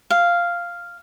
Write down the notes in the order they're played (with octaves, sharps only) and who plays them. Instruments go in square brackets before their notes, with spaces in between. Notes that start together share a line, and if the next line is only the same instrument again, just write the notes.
[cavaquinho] F5